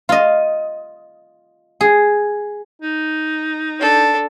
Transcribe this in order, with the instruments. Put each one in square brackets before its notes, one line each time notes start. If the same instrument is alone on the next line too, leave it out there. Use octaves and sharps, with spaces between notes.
[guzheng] F4 D#5
G#4
[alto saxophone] D#4
[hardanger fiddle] D4 A4